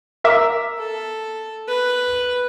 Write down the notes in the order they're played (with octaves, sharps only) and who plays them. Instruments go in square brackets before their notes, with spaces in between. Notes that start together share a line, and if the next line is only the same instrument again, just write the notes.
[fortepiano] A#4 E5 D6
[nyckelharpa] A4
B4